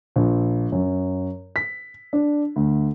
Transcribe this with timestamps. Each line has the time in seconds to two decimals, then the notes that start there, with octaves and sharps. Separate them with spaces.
0.16 A#1
0.72 F#2
1.56 B6
2.13 D4
2.56 D2